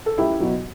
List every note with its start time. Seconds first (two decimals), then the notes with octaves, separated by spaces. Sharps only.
0.06 A4
0.18 C#2 E4 G4
0.40 B2 F#3